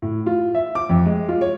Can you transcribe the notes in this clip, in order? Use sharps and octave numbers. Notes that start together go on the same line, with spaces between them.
A2
F4
E5
D6
F2
G#3
F4
C#5